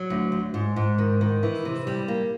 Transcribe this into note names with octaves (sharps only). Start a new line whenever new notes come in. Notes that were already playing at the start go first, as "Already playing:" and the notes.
Already playing: F#3
D2
D2
G#2
G#2
D#3
D#3
E3
C3
G3
A#3